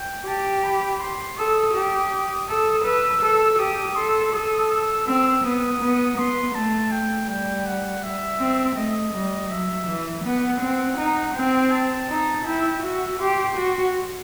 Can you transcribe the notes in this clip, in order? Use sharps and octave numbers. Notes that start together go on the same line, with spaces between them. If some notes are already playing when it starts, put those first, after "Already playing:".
Already playing: G5
G4 A5
B5
C6
A4 D#6
G4
A4
B4 E6
A4
G4 D#6
A4 C6
A4 D#6
E6
C4 E6
B3 D#6
B3
B3 C6
A3 A5
G5
G3 G5
F#5
E5
C4
A3 D#5
G3
F#3 E5
E3
B3 F#5
C4
D#4
C4 G5
A5
D#4
E4 G5
F#4 E5
G4 C6
F#4